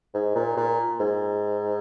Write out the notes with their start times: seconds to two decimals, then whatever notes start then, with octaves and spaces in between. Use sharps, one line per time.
0.14 G#2
0.36 A#2
0.57 A#2
1.00 G#2